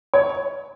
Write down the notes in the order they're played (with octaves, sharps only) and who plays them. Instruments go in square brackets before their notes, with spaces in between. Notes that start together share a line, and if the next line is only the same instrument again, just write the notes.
[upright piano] C#5